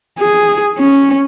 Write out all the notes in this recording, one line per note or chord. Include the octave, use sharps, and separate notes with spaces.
G#4
C#4